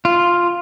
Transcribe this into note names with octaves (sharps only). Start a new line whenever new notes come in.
F4